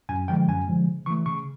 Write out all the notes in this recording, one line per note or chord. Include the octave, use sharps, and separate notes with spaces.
F#2 G#5
D3 F3 G#3 G5
F#2 G#5
D3 F3 G#3
C#3
E3 A3 C#6
C#3 C#6